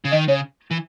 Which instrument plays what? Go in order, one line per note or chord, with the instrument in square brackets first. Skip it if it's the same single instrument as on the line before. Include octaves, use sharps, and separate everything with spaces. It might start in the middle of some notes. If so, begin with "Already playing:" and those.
[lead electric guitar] C#3
[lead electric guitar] D#3 [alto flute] D#5
[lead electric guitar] C#3 [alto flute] C#5
[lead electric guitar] E3